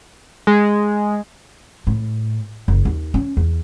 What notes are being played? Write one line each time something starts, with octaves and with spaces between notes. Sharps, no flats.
G#3
A2
F#1
D#2
C#4
E2